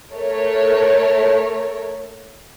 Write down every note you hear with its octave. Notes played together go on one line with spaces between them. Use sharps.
A3 A#4 C#5